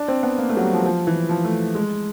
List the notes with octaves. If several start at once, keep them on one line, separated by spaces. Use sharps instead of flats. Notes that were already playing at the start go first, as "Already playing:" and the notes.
Already playing: D4
C4
B3
A#3
A3
F#3
G3
F3
F3
E3
F3
A3
G#3